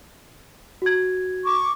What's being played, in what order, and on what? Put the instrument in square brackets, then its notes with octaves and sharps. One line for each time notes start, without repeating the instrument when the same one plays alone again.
[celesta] F#4 G#6
[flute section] C#6 D6